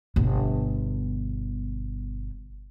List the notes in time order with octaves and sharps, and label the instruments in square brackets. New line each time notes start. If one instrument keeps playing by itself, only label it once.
[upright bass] G1 B2